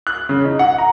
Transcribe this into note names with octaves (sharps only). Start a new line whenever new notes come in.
F#6
C#3
D#4
F#5
A#5